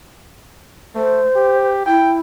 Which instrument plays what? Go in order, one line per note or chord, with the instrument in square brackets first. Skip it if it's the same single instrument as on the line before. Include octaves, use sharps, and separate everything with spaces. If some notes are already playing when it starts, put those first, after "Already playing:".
[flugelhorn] A3 [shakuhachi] C5
[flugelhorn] G4
[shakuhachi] E4 [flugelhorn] G5